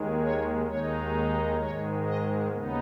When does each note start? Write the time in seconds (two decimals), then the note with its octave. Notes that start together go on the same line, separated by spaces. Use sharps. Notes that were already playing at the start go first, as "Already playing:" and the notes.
Already playing: D#2 D#3 G#3
0.20 C#5
0.65 D#2 D#3 G#3 D#4 C#5
1.57 G#2 D#3 G#3 C#5
2.03 D#5
2.49 D#2 C#3 B3 D#4